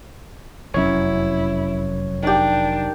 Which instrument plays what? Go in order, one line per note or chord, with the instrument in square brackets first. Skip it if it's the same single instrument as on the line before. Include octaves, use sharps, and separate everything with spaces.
[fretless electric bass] F1 F#2 C#4 [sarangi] E4 [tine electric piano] C#5
[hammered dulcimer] D#3 G4 [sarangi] D4